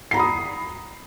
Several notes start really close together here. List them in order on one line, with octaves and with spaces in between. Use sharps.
C7 A#5 B5 D#6